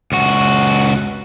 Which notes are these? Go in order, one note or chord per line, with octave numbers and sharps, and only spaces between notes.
C#2 F#4